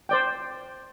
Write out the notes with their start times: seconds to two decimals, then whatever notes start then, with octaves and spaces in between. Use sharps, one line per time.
0.09 C5 D5 G5